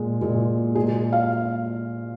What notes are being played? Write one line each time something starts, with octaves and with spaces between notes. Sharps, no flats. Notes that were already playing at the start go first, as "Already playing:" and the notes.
Already playing: A#2 G#3
A#2 G#3
A#2 G#3 G#4
F5